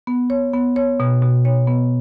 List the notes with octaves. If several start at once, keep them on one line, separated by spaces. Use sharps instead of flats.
B3
C#5
B3
C#5
B2
B2
C#5
B3